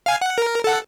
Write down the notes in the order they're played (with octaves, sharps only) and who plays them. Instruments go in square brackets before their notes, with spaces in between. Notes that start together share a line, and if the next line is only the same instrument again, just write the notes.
[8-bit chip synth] F5 G#5
F#5
A#4
A4 F#5